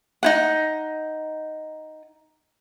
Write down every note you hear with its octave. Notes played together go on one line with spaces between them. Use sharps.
D#4 E4 F#5